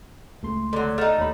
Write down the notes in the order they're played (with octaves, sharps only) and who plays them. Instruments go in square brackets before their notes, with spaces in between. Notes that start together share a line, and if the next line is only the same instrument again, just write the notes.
[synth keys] C#2 A3 C6
[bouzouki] D3 F#3
[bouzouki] A3 D#4 [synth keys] F#5 F6
[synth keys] D#2 C#5 B5